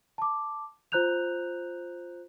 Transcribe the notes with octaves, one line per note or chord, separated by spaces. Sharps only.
A5 D6
F4 C5 A#5 F#6 G6 F7